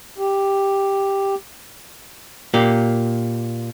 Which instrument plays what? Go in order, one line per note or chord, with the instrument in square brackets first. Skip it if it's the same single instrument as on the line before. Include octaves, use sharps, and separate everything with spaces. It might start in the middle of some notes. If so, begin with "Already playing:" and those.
[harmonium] G4
[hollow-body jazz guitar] A#2 A#3 G4